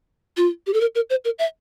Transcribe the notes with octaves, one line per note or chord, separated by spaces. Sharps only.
F4
G4
A4
A#4
A#4
C5
A#4
E5